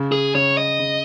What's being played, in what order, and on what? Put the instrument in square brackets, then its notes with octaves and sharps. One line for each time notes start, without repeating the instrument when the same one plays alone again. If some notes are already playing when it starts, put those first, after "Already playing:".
Already playing: [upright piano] C#3
[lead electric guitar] G#4
[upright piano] C#3 [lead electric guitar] C#5
[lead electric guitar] D#5
[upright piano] C#3